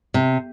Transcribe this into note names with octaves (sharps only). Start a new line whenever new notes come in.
C3